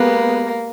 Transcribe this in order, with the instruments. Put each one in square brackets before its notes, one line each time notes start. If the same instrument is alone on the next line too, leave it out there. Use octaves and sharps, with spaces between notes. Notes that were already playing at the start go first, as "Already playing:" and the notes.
Already playing: [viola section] G#3 B3 G4 B4 [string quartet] A#3